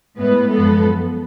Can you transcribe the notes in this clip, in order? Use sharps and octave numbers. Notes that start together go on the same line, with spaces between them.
A2 G#3 B3 B4
F#2 F3 G#3 B3 A4